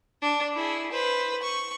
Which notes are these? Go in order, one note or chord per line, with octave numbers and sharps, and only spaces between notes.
D4
E4 G#4
B4 C5
C#6